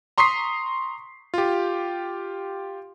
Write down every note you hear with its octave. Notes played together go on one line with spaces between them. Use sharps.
A#5 C6 C#6 D#6 B6 C7
F4 G4